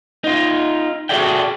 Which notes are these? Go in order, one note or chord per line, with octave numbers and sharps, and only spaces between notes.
D#4 F4
F#4 G#4 A4 D5 E5 G5